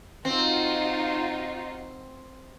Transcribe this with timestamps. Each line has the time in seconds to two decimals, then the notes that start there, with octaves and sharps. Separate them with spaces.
0.25 C4 D#4 F4 F#4